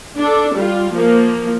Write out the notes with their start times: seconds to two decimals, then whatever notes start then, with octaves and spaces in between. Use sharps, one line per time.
0.18 D4 A4
0.56 G3 F4
0.93 F3 A#3